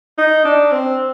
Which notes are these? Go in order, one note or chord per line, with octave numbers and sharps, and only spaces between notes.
D#4
D4
C4